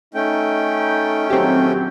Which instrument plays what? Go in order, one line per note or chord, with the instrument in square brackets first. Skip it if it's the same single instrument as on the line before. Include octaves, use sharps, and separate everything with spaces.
[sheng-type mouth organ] A3 C#4 G5 [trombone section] D#4
[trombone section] A#1 D#3 F#3 [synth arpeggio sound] C4 G4